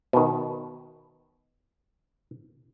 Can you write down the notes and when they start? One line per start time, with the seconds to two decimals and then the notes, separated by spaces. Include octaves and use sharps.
0.13 B2 D#3